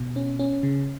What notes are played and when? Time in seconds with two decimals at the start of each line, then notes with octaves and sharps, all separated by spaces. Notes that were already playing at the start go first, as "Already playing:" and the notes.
Already playing: B2
0.16 C#4
0.39 C#4
0.63 C#3